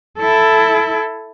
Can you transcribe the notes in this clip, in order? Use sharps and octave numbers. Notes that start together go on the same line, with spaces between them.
E4 A4